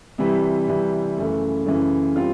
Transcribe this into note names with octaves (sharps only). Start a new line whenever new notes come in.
C3 E3 G3
C3 E3 G3
F#2 C#3 E3 A3
F#2 C#3 E3 A3
G3 C4 F4